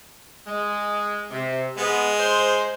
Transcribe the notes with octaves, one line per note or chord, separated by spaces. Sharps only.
G#3
C3
G#3 B3
C5